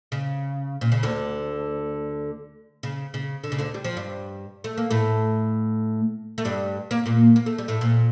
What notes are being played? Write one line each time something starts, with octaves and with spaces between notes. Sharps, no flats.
C#3
A#2
C#3
D2 D3
C#3
C#3
D3
C#3
D2 D3
G3
F3
G2 G3
A3
A#3
A2 A3
A3
G2 G3
A#3
A#2 A#3
A#3
A3
G3
A2 A3
A#2